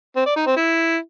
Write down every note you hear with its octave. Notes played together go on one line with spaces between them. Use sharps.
C4
D5
D#4
C4
E4